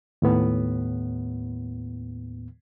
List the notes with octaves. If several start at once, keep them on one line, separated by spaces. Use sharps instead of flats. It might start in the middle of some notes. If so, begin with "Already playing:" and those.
D#2 A2 B3